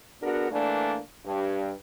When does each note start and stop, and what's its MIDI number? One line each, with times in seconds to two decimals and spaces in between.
0.23 0.47 59
0.23 0.47 62
0.23 0.47 66
0.23 0.47 68
0.23 0.47 70
0.51 0.99 52
0.51 0.99 57
0.51 0.99 58
0.51 0.99 62
1.25 1.73 43